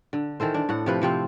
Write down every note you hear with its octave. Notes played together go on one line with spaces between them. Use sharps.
D3
D#3 E3 A4 C5
D4
A2 F#5
C3 F3 B4
C3 F3 C4